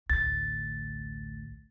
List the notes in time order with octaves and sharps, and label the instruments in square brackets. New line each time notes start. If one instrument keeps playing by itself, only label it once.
[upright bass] A1 D2 [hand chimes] A6